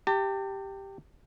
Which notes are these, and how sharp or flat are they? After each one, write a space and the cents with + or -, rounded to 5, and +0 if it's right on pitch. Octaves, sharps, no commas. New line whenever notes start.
G4 +0 A5 +40